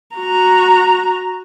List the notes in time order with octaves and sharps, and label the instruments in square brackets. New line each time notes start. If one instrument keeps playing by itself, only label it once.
[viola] F#4 A#5